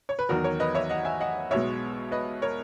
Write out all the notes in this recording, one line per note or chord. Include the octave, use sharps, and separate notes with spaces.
C#5
B4
E2 D#3 F#3 F#4 A#4
A#4 C#5
B4 D#5
C#5 E5
D#5 F#5
E5 G#5
D#5 F#5
B1 B2 G#3 C#5 E5
B4 D#5
A#4 C#5